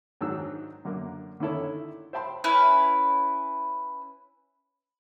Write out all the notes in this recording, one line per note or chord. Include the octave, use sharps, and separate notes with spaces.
G#2 D#3 F#3 D4 D#4 E6
F#2 D3 A#3
D3 D#3 C#4 E4 A4 C#5
C5 E5 G5 A5 B5 C6
C#4 E4 B4